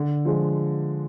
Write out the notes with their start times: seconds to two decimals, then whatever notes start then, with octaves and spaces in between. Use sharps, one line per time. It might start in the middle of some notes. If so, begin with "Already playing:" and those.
Already playing: D3
0.25 F3 G#3